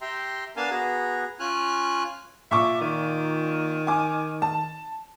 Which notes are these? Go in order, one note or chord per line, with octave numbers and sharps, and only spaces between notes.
G4 E5 G5 A#5 C6
B3 D4 A#4 F5 G#5 A5
B3 F#4 G#4 A#5
C#4 F4 G#5 F6 F#6
A#2 E5 C#6 D6
D#3
G#5 D6
A5